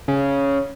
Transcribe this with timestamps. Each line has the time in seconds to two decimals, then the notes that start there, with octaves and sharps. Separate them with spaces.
0.08 C#3